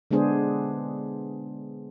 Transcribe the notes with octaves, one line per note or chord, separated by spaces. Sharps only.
D3 G#3 B3 D4 G#4 C5